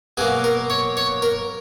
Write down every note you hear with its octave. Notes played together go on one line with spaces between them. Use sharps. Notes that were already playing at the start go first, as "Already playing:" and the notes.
B2 F#3 A#3 G#4
A#4
C#5
C#5
A#4